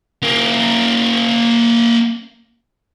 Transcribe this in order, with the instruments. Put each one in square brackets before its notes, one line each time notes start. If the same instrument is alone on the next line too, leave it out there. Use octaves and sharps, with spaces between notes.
[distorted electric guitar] A#3 C#4